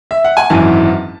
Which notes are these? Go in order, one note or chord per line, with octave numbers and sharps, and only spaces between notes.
E5
F#5
G#5
G#1 F#2 E3 A5